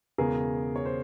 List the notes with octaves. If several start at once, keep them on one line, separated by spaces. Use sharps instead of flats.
E1 E2 C#3 G#4 A#4
C#5
C5